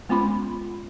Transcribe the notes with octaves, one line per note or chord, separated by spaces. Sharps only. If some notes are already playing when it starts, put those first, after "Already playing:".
G#3 B3 C#4 F4 B5 C6